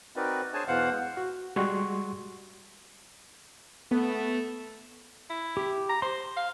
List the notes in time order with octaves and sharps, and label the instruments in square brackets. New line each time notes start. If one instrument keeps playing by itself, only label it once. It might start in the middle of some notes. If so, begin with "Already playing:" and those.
[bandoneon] C4 D#4 F#4 A#4 B4 D5
D4 G#4 C5 C#5 G#5 A5
E2 B2 E3 C5 F5 F#5
G#3
[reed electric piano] F#4
G3 G#3 F#4 C6 C#6
[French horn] A3 [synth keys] B3
[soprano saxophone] E4
[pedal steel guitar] G4
[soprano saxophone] A#5
[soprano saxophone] C5 [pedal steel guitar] C6
[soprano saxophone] F5